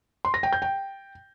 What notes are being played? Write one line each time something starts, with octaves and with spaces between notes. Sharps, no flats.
C6
A#6
G5
G6
G5